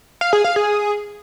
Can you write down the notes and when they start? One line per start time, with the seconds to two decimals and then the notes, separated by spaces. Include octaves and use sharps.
0.21 F5
0.33 G#4
0.44 F5
0.56 G#4